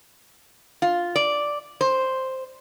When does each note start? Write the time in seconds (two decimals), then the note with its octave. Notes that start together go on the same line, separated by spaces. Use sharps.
0.82 F4
1.16 D5
1.81 C5